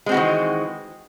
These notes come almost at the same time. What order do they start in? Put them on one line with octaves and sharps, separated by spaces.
G#3 C4 F#4 E3 D#3